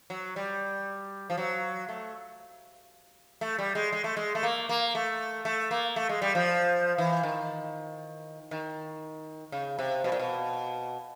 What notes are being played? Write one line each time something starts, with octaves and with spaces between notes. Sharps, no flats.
F#3
G3
F3
F#3
A3
A3
G3
G#3
G#3
A3
G#3
A3
A#3
A#3
A3
A3
A#3
A3
G#3
G3
F3
E3
D#3
D#3
C#3
C3
B2
A#2
B2